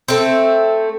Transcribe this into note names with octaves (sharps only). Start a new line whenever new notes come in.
A3 C4